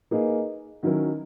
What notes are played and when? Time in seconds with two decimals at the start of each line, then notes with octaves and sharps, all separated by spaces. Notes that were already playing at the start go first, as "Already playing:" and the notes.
0.11 A#3 D#4 G#4 B4 D#5
0.83 D#3 F#3 C#4 E4 A#4